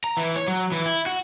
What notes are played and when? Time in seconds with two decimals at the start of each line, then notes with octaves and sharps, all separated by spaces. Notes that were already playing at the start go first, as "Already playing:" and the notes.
0.04 A#5
0.17 E3
0.36 C#5
0.48 F#3
0.72 E3
0.86 E4
1.06 F#4